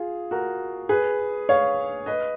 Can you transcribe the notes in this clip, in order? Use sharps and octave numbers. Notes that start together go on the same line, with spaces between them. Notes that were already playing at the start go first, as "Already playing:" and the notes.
Already playing: F4 G#4
F#4 A#4
G#4 B4
C#5 F5
B4 D#5